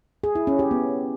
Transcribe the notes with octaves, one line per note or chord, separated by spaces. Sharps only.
G#4
E4
C#4
G4
B3